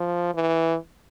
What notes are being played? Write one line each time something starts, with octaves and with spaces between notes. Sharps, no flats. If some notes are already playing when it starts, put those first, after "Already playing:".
Already playing: F3
E3